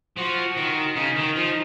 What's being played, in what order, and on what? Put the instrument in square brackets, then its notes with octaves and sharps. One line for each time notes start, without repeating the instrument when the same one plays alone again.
[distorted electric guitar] F3 [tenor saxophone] F#4
[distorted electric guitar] D#3
[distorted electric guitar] C#3 [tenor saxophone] D#4
[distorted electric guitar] D#3
F3